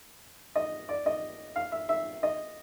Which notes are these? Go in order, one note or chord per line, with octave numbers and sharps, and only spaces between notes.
D#5
D5
D#5
F5
E5
E5
D#5